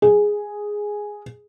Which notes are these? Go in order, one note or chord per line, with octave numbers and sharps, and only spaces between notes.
G#4